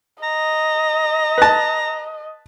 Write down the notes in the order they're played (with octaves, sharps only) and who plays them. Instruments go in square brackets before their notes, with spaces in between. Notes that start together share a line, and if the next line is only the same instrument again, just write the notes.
[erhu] D#5 [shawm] A#5
[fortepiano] B4 A5